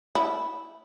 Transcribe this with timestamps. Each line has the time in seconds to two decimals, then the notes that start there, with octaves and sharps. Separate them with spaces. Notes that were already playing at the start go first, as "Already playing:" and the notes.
0.15 E4